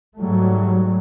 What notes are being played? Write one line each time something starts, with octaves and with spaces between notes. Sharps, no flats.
G#2 F#3 G3 A3